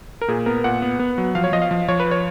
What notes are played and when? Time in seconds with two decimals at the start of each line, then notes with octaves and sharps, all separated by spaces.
0.21 A#4
0.28 A#2 G#4
0.46 B3 A#4
0.64 A#2 F#5
0.82 B3
0.99 B3
1.18 F#3
1.35 F3 F5
1.44 C#5
1.53 F3 D#5
1.62 F5
1.71 F3
1.88 F3 C#5
2.00 B4
2.11 C#5